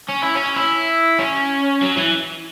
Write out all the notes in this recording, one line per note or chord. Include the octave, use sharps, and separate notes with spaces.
C#4
E4
C#4
E4
C#4
F#3
E3